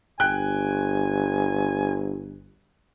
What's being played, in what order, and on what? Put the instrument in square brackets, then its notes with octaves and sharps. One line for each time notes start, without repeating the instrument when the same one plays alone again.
[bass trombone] G1 [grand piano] G5 F#6 [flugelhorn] G#5